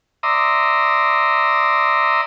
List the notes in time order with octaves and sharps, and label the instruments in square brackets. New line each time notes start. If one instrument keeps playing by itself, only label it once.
[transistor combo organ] D5 E5 A#5 C6 D#6